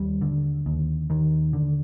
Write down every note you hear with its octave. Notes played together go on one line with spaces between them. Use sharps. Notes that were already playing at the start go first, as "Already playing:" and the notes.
Already playing: D#2 G3
D3
D#2
D#2 D#3
D3